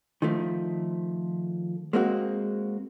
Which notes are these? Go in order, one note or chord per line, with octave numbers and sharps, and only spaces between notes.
D#3 F3 A3
G#3 A#3 C4 F#4